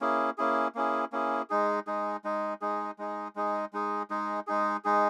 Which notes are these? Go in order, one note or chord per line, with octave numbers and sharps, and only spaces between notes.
A#3 C#4 E4 G#4
A#3 C#4 E4 G#4
A#3 C#4 E4 G#4
A#3 C#4 E4 G#4
G#3 D#4 G#4
G#3 D#4 G#4
G#3 D#4 G#4
G#3 D#4 G#4
G#3 D#4 G#4
G#3 D#4 G#4
G#3 D#4 G#4
G#3 D#4 G#4
G#3 D#4 G#4
G#3 D#4 G#4